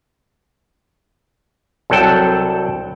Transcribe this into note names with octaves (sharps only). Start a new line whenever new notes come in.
C2 F#3 A4 F#5 G5 A5